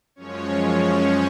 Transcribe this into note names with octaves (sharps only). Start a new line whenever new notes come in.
F#2 F3 G#3 C#4 C#5
C#4 C#5